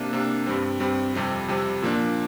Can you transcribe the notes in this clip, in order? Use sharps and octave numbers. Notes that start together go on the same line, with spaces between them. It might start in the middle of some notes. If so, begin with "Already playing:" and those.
Already playing: C3 A#3 D4
C3 A#3 D4
G2 G3 C4
G2 G3 C4
F2 C3 G3 C4
F2 C3 G3 C4
A#2 F3 A#3 D4